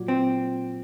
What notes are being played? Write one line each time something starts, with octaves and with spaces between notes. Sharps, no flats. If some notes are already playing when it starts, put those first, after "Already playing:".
Already playing: A#2 F#3
C4